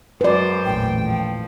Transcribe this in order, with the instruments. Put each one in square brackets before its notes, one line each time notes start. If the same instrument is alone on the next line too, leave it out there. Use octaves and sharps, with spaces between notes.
[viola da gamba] F#2 C5 [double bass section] G#3 [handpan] B4 D5
[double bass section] A1 E2 A#2 [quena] G5
[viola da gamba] F3